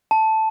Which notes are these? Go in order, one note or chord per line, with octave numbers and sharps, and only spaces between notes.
A5